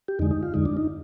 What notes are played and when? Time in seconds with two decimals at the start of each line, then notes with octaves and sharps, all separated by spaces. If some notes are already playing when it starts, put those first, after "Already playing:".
0.08 G4
0.19 F2 D3 G#3 D#4
0.31 D#4
0.43 F4
0.54 F2 D3 G#3 D#4
0.65 D4
0.77 D#4